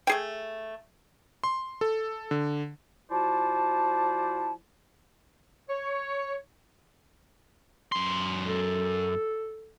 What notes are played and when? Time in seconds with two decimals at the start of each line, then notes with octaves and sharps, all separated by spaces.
0.07 A3 G#4 G5
1.44 C6
1.81 A4
2.31 D3
3.11 F3 E4 F#4 C5 D5 A5
5.68 C#5
7.92 F#2 C6
8.46 A4